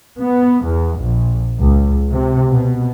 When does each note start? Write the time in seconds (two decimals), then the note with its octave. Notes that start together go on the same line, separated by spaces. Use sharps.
0.21 B3
0.66 E2
1.00 A#1
1.59 C#2
2.11 C3
2.50 B2